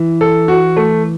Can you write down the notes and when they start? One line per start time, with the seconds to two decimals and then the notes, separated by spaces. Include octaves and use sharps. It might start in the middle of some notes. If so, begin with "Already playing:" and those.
Already playing: E3
0.21 A4
0.48 F#4
0.77 A3